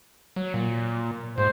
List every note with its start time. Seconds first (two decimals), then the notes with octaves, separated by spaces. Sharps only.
0.36 F#3
0.54 A#2
1.38 G#2 C5